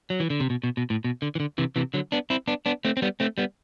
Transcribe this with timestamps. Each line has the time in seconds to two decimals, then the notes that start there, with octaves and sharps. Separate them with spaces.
0.10 F#3
0.20 E3
0.30 D3
0.40 C3
0.50 B2
0.64 B2
0.77 B2
0.90 A2
1.04 B2
1.22 D3
1.35 E3
1.40 D3
1.58 C3 E3
1.76 C3 E3
1.94 D3 F#3
2.12 B3 D4
2.30 C4 E4
2.47 B3 D4
2.66 B3 D4
2.85 A3 C4
2.97 C4
3.02 G3 B3
3.20 A3 C4
3.38 G3 B3